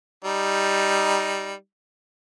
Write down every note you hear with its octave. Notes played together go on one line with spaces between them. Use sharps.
G3 D#4